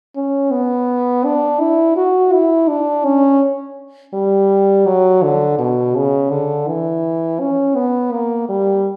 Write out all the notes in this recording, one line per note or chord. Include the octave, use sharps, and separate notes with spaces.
C#4
B3
D4
E4
F#4
E4
D4
C#4
G3
F#3
D3
B2
C#3
D3
E3
C#4
B3
A#3
G3